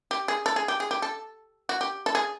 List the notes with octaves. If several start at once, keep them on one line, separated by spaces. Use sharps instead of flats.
G4
G#4
A4
G#4
G4
G#4
G4
A4
F#4
G4
A4
G#4